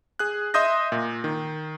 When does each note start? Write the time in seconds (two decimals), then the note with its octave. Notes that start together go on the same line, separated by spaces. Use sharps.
0.19 G#4 F#6
0.54 D#5 E5 C6 D#6 G6 A#6
0.92 A#2
1.24 D#3